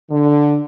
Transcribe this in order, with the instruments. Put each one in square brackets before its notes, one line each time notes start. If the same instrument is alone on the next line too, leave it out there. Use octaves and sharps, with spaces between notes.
[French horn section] D3